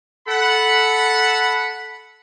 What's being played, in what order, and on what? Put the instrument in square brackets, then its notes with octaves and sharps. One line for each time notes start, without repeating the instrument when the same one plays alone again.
[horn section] A4 F#5 B5